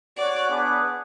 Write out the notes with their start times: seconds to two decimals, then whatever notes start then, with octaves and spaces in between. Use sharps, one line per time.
0.18 F#4 C#5 D5 F#5
0.50 B3 D4 G#4 B4 F#5